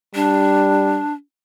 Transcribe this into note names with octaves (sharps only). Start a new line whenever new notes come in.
G3 D4